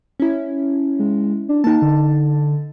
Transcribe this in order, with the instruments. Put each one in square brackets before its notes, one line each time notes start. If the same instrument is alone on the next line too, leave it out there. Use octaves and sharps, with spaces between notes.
[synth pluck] C#4 E4
[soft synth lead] G#3
D4
[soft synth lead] A#3 [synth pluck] D#4 A5
[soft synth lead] D3